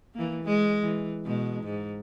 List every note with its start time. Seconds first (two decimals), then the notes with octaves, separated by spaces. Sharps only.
0.14 E3 A#3
0.44 G#3
0.82 E3
1.25 B2 G#3
1.63 G#2